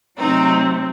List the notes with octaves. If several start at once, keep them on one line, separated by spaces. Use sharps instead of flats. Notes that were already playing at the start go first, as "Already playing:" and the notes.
C3 F#3 A3 C4 D#4